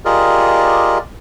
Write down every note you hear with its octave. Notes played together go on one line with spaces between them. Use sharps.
F4 G4 G#4 A#4 D5 D#5